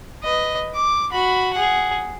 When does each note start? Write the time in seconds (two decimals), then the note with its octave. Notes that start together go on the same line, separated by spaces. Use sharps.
0.24 B4 D#5
0.75 D6
1.12 F#4 B5
1.54 G#4 F#5